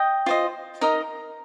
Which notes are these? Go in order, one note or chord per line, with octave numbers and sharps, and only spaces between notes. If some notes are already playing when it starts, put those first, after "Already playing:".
Already playing: D#5 G5
F4 C5 D#5
D#4 A#4 D#5